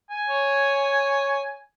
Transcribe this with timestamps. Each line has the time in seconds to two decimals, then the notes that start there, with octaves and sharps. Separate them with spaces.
0.10 G#5
0.28 C#5